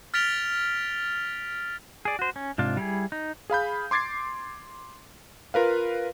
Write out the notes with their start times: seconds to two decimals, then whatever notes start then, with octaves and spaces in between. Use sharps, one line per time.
0.14 F6 A6 B6 D7 F7 G7
2.05 G#4 D5
2.19 F#4 C5
2.36 C#4
2.58 G#2 C3 D4 F4
2.77 G3 E4 G#4
3.12 D#4
3.50 G#4 F5 B5 G6
3.91 C6 D6 G#6 A6 C7
5.54 F4 A#4 B4 F5